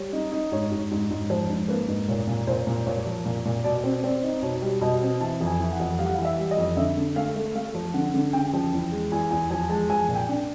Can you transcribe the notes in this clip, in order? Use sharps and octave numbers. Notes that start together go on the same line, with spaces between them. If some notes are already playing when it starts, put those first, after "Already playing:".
Already playing: G3 C#5
D#4
D#4
G#2 C#5
G#2
G#2
G#2
F3 C5
G#2
A#3 B4
G#2
A#2 C#5
A#2
A#2 C5
A#2
A#2 C#5
F3
A#2
A#2
B2 D5
C4
C4 D5
D#4
B2 C#5
G3
B2 D#5
C4
E3 A5
F2
G#5
E3
F#5
F2
G3 F5
F#5
E3 F5
E5
G3
D#5
F2
D3 E5
D3
A3 F5
A3
A3 F5
F3
D3 F#5
D3
C#3 G5
F3
E2
G#3
E2 G#5
E2 G#5
F3 G#5
G#3 A5
F3 G#5
A#2
G5
D4